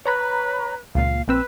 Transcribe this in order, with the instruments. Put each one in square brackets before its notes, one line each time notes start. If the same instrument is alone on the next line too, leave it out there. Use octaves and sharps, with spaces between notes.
[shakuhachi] B4 [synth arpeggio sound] C#5 A#5 B5
[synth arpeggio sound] C#2 A#2 [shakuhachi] F5
[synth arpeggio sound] A#1 C4 E6 [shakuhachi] B4